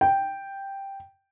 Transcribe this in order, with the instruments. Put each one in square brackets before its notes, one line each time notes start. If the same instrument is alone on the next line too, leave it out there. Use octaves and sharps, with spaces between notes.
[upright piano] G5